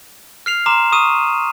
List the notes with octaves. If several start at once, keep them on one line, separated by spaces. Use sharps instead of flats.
F6 C7 F7
A#5 C6 D6 E7
C#6 D#6 D#7